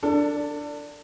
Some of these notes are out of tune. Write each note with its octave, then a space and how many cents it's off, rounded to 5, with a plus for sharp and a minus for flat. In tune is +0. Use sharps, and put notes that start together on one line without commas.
D4 -5 A4 +30